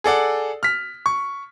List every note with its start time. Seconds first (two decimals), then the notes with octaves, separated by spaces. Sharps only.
0.04 G#4 A4 D5 F#5
0.63 F6 B6
1.06 C#6